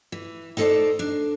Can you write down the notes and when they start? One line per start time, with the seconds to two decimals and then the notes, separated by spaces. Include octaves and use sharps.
0.12 E3
0.57 D#4 E4 A4 A#4 C5 D5
0.99 D4